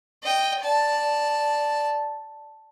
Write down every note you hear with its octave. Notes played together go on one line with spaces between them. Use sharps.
D#5 G5
D5 A5